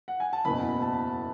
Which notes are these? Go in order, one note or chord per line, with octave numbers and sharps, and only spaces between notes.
F#5
G#5
A5
F#1 E2 B2 B5
A5